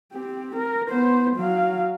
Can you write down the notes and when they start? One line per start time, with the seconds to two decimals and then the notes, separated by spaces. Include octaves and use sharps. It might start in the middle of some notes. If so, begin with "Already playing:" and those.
0.12 C4 G4
0.56 A#4
0.89 B3 C5
1.36 F#3 F5